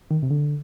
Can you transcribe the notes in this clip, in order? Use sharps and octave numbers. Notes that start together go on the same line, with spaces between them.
D#3
C3
D3